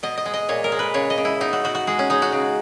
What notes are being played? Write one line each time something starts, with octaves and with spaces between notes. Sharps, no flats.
B2 D#5
D#5
G#3
D#5
A#2 C#5
A#4
G#3
B4
C#3 C#5
D#5
C#3
E4
B2 D#4
F#4
B2 F#4
F#4
G#3 G#4
C#4
G#3 D#4
F#4
C#3